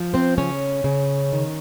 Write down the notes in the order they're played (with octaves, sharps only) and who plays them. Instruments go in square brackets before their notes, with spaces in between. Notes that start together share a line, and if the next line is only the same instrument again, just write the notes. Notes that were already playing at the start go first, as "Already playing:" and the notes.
Already playing: [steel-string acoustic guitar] F3
C4 C5
C#3 C#4 C#5
C#3
D#3